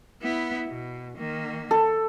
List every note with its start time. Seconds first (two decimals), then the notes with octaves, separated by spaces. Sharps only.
0.22 B3 E4
0.68 B2
1.17 D#3 A#3
1.71 A4